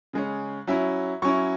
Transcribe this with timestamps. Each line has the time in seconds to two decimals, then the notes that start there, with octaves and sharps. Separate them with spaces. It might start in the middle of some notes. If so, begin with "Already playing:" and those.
0.13 C#3 G#3 C#4
0.67 F#3 C#4 E4 E5
1.22 F#3 C#4 E4 C#6